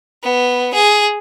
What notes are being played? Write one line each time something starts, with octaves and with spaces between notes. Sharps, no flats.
B3
G#4